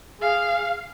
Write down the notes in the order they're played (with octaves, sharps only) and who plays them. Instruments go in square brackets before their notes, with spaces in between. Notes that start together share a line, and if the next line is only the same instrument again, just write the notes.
[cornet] G#4 [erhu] F5